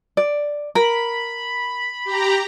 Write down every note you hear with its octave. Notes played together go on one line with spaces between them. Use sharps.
D5
A#4 B5
G4 A#5